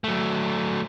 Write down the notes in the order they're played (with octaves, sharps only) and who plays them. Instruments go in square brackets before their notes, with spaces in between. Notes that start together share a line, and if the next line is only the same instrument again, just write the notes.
[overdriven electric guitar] F#3 A3